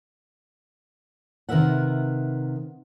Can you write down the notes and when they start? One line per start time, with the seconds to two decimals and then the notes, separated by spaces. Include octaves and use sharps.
1.49 C3 D#3 A#4 B4 E5 F#5